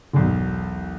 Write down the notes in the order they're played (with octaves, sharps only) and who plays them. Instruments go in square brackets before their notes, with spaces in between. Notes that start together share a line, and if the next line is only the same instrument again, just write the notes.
[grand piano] E1 B1